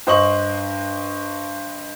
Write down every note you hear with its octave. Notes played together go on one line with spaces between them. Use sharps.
G2 C5 D#5 C#6 F#7